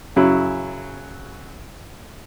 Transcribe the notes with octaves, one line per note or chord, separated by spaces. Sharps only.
F#2 C#3 F#3 E4